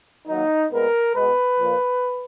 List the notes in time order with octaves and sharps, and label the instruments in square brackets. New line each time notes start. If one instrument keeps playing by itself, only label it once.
[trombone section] D#3 F#3 A#3 D#4
A#2 G#3 B3 A#4
B2 G#3 B3 B4
A#2 F3 A#3